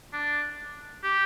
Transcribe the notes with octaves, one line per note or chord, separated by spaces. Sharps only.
D4
G4